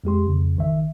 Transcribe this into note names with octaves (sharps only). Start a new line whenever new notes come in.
F2 G#3 G4 C6
F2 C#3
A1 D#3 E5